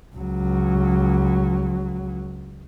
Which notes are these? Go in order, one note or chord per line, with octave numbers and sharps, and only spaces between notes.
C#2 F#3